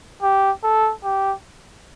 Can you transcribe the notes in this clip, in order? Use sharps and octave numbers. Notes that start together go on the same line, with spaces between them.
G4
A4
G4